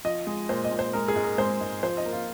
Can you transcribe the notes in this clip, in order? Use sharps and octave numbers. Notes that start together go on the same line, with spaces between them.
F3 D#5
G#3
A#2 C5
D#5
A#2
C5
G#3 A#4
G#4
G#2
A#4
G#3 C5
G#2
F3 C5
D#5
A#3
F4